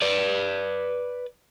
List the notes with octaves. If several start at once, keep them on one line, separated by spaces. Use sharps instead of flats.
B4 D5